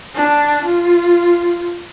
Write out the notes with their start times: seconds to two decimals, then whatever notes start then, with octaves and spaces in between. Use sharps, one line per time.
0.15 D4
0.65 F4